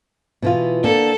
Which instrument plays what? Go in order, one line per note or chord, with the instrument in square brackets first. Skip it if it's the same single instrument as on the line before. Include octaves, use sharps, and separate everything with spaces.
[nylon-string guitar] B2 E3 F4
[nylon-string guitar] D3 A#3 [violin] A4